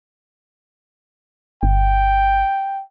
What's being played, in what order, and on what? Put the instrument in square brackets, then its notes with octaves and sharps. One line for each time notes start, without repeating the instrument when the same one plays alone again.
[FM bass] G1 [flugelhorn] G5